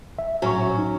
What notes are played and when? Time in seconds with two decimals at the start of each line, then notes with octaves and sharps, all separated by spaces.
0.19 E5
0.42 A2 F#3 C#4 C#6
0.78 D#4